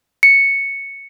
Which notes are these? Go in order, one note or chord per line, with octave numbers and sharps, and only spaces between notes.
C#7